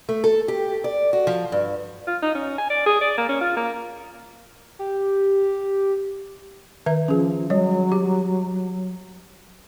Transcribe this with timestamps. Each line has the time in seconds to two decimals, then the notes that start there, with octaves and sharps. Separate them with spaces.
0.09 A3
0.24 A4
0.48 G4
0.84 D5
1.13 F#4
1.27 F3
1.52 G2
2.07 F4
2.22 D#4
2.35 C#4
2.58 G#5
2.70 D5
2.86 G#4
3.01 D5
3.17 A#3
3.29 C#4
3.41 F4
3.56 A#3
4.79 G4
6.86 D#3 B4 E5
7.08 F3 C#4 G#4
7.50 F#3 G3 C#5
7.92 G4